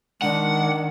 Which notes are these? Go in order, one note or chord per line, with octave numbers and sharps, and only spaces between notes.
D#3 G#3 D4 F#5